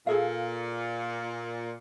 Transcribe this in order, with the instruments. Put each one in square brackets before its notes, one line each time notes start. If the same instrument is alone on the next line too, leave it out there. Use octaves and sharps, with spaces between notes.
[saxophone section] A#2 [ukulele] G#4 A4 F5